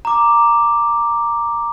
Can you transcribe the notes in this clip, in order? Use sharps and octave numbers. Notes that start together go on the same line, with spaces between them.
A#5 D6